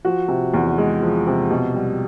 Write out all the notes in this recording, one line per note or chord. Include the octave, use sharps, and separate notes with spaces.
F3 F#4
C3
E2
G#3
F3
C3
B2
G3